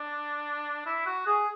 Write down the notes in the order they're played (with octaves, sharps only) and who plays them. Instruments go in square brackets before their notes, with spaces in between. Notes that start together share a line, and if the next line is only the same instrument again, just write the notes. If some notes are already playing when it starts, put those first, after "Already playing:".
Already playing: [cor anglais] D4
E4
F#4
G#4